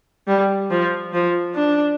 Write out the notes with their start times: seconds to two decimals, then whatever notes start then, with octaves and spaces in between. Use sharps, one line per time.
0.27 G3
0.70 F3
1.13 F3
1.55 D4